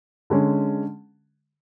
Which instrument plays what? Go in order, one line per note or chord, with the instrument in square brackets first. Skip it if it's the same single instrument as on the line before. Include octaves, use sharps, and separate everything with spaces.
[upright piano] D3 G#3 C#4